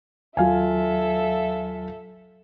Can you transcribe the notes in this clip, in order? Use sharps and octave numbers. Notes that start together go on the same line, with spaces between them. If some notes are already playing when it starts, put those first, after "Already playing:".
D#2 F#3 F4 A4 E5 F5 G#5